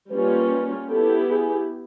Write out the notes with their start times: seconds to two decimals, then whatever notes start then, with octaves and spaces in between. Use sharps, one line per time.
0.11 G3 A#3 C#4 F4 B4
0.89 B3 E4 G4 A4
1.29 G#4